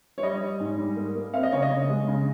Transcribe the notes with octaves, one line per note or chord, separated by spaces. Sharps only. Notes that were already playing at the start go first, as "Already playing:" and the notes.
C#5
G3 D#5
G3
G#2
G3
A#3
A#3
C4 F5
D#5
C#3 C#5
D#5
C#3
G#3
C#3